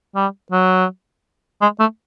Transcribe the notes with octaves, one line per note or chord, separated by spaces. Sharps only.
G3
F#3
G#3
A3